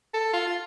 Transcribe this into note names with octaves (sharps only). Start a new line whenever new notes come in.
A4
F4
F4